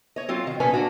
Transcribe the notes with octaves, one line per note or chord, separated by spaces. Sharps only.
C#5 D#5
F#3 C4 F4
D#3
F#2 A#2 D#3 C#4 B4 G#5
A#3 D4 F#4